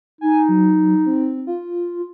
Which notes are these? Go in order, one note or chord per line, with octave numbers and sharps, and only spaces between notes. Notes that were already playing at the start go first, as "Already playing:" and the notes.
D#4 G#5
F#3
C4
F4